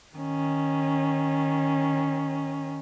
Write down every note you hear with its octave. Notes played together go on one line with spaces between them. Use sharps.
D#3 C#4